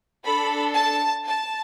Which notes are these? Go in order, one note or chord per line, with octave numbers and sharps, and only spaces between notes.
D4 A4 B5
A5
A5